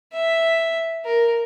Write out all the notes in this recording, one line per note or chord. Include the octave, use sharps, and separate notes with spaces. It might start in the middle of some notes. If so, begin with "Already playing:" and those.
E5
A#4